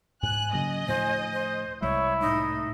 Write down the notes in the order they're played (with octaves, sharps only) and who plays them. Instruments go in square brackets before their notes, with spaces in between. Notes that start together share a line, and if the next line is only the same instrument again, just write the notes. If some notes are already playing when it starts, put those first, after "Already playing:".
[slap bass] G#2 [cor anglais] G#5 [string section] F#6
[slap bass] C#3 F#3 A#3 [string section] D#5
[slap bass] D2 A2 F3 [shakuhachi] C5
[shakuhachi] C5
[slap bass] C2 G3 G#3 [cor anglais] E4 [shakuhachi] C#5
[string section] A2 [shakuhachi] D#4